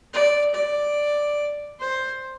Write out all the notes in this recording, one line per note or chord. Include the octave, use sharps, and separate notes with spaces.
D5
D5
C5